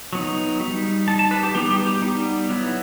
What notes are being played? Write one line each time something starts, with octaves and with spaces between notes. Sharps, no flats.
F#3 B3 D#4
G3 D#4
G3 D#4 A5
A5
B4
G4
G3 B3 D#4 G4
G4
G4
G3 B3 D#4
F#3 B3 E4